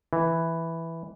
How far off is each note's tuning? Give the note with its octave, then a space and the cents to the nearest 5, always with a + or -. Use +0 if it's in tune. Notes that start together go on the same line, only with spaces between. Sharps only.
E3 +0